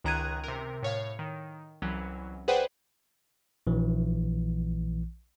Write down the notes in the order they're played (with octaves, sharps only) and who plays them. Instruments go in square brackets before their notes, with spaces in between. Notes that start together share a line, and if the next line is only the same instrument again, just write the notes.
[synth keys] C#2 D#3 A#5 F#6 G#6 D#7
C3 A#4
A2 C#5 F5
D#3
C2 E3 F#3 C#4
G#4 B4 C5 D5 F#5 G5
[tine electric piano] A#1 E3